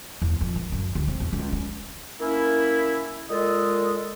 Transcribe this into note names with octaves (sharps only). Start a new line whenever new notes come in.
E2
F2
D#3
F#2
D2
C4
E2
C#2
C#4
A#3 C#4 E4
A#2 G#3 A4 D#5